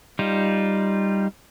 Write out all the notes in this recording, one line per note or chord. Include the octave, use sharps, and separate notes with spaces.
G3 D#4 F4